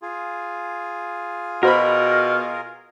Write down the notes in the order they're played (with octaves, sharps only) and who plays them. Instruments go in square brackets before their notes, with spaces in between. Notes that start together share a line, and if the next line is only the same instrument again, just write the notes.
[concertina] F4 G#4
[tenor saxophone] B2 [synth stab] F#4 C5 B5 [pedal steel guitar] A#4